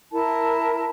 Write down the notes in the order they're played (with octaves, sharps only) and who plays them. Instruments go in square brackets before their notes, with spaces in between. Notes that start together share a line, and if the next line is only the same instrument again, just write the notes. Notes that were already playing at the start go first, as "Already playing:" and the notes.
[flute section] E4 A#4 A5